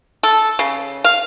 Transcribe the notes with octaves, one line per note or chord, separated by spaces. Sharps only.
A4
C#3
F5